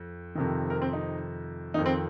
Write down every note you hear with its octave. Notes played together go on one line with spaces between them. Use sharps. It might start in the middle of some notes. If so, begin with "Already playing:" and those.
Already playing: F2
F2 C3 D#3
A#4
C4
D#4
F2 D#3 D#4
C4